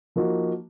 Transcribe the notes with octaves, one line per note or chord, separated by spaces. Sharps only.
F3 A#3 D#4 F#4